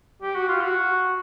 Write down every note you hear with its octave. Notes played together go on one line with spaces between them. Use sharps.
G4
F#4
F4
F#4